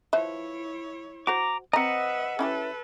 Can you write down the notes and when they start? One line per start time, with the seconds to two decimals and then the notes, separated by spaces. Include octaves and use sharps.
0.13 F3 E4 B4 C#5 E5
1.27 F#4 C5 A#5 D6
1.73 C4 B4 D#5 E5 F#5 A#5
2.39 C#4 E4 G4 A4 B4